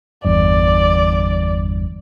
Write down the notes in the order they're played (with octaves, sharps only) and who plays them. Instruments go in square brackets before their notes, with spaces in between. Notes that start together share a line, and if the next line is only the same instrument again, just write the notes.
[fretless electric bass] G1 E2 G2 [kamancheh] D5